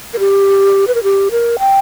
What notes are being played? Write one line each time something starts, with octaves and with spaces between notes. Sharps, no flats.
A#4
G4
B4
A#4
G4
A#4
G5